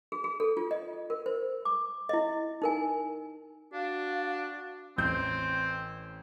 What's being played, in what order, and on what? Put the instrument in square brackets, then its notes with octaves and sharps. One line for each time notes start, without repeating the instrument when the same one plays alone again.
[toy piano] G#4
G#4
A4
F4
D#5
A#4
C5
D6
E4 D#5
D#4 A#4 G#5
[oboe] D4 [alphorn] F#4 [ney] F5
[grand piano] A1 G6 [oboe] C4